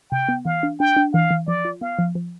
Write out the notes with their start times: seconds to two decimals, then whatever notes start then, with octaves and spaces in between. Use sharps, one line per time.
0.11 C3 G5
0.29 B3
0.45 E3 F5
0.63 D4
0.80 D4 G5
0.97 D4
1.14 E3 F5
1.31 E3
1.47 F3 D5
1.65 F4
1.81 B3 F5
1.99 F3
2.15 F3